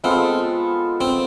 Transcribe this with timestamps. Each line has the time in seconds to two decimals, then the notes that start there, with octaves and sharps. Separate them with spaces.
0.04 G#3 B3 C4 F4 A4
1.01 C4